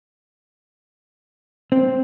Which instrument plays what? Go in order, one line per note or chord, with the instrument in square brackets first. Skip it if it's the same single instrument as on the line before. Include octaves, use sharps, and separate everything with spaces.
[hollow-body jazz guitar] C4